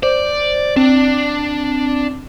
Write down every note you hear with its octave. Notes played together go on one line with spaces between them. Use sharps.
C5 D5
C4 D4